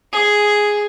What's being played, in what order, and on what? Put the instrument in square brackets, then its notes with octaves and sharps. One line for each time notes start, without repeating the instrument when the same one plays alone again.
[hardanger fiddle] G#4